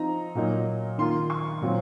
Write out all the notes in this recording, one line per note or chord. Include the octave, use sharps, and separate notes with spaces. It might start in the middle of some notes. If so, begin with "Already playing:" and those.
Already playing: F3 C4 D#4 A#5
A#2 F#3 A#3 D#4
D#3 A#3 F4 C6
C#6
A#2 F#3 C4